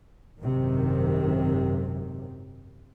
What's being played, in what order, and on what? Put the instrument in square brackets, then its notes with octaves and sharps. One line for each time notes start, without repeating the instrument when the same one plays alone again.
[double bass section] G#1 F#2 C3 D#3 F#3